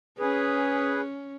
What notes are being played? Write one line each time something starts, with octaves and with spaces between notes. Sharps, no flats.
C#4 G#4 B4